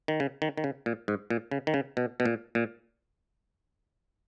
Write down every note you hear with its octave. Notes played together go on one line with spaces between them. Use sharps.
D#3
C#3
D#3
D#3
C#3
A#2
G#2
A#2
C#3
D#3
C#3
B2
B2
A#2
A#2